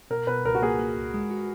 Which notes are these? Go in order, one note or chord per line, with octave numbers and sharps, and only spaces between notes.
B2 A#4
B2 B4
C#2 A#4
F#4
A#3 G#4
A#3
C#2
G#3
F#4